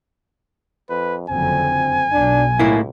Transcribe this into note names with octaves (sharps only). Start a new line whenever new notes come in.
F2 B4
F#1 F2 D3 C4 G#5
B1 D4
C#2 A2 A#3 E4